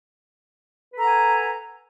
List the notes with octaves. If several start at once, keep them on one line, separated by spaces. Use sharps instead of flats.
A4 B4 F#5 G#5 A#5